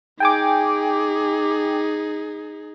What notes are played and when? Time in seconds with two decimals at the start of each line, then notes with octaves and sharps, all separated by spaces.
0.20 D#4 G#4 G5 G#5 D6